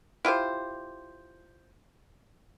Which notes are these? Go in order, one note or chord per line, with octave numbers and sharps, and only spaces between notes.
E4 F4 G4 C5